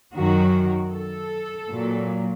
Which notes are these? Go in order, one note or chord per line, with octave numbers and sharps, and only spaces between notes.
F#2 D#3 F#3 F#4
A4
A#2 F#3